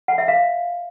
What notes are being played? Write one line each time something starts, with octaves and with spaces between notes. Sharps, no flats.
F#5
E5
F5